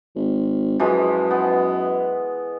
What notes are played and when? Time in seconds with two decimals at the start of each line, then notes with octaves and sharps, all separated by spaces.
0.16 G#1
0.80 F#2 E3 F3 G#3
1.31 B3